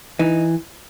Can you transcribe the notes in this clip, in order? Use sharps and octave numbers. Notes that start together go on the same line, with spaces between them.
E3 D#4